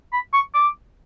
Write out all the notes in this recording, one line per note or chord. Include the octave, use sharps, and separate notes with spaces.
B5
C#6
D6